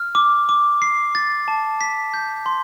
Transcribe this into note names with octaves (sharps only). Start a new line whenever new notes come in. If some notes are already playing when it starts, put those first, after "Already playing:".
Already playing: F6
D6
D6
C7
A6
A5
B6
G6
C6